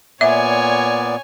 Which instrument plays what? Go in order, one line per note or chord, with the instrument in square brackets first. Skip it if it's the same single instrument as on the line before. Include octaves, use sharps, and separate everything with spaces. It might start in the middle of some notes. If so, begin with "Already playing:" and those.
[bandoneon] A#2 B3 D5 [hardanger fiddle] C#5 G#5 [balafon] E5